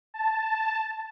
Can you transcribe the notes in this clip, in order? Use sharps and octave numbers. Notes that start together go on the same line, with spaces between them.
A5